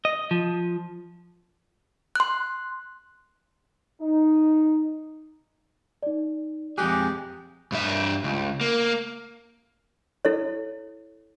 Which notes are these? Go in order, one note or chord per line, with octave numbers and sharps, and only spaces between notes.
D#5
F3
C6 F#6
D#4
D#4 D5
F2 G#3 G4 G#4 F#6
G2 E5
C#2
A#3
E4 A4 C#5